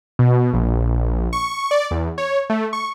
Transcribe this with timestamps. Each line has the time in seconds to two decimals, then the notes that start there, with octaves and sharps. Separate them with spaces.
0.19 B2
0.53 A#1
1.33 C#6
1.71 D5
1.91 E2
2.18 C#5
2.50 A3
2.73 C#6